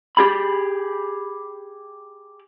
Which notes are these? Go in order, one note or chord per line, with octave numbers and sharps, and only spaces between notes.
G4 G#4 B5